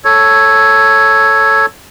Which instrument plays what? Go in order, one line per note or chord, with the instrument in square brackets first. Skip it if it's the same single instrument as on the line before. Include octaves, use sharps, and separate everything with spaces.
[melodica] A4 C#5